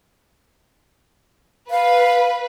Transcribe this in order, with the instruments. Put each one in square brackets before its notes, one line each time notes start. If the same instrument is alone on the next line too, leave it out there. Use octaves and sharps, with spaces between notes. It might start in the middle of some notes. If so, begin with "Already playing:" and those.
[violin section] B4 [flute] F5